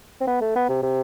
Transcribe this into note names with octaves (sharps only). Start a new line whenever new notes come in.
C4
B3
A3
B3
C3
C3